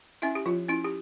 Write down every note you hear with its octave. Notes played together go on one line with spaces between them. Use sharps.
C#4 E4 E5
G4
F3 F4
C#4 E4
G4